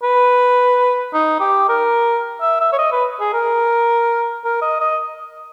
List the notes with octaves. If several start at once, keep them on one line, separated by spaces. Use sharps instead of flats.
B4
D#4
G4
A#4
E5
E5
C#5
D#5
B4
G#4
A#4
A#4
D#5
D#5